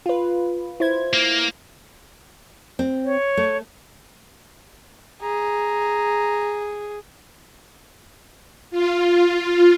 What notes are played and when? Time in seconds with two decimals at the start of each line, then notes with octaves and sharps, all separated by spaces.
0.06 F4 B4
0.80 E4 C5 G#6
1.13 A#3
2.79 C4
3.05 C#5
3.37 A3
5.22 G#4 A#5
8.71 F4